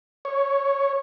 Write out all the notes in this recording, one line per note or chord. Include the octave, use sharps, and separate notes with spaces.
C#5